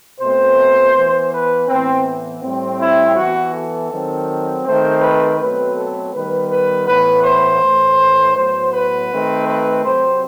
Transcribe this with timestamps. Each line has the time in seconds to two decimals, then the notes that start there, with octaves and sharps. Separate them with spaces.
0.20 B2 A3 C4 C5
0.94 E3 B3
1.32 B4
1.68 A2 E3 B3 C4
2.43 A2 G3 C4
2.80 E4
3.16 E3 B3 F#4
3.54 A4
3.90 D#3 F#3 C4
4.65 D#3 A3 C4 C5
5.02 B4
5.39 B2 F#3 A3 C4 B4
5.77 A4
6.13 D#3 G3 B3 B4
6.50 B4
6.87 A2 E3 B3 B4
7.24 C5
7.62 A2 E3 A3
8.35 A2 F#3 B3 C5
8.73 B4
9.10 D#3 A3 C4
9.47 B4
9.84 C3 F#3 C4 C5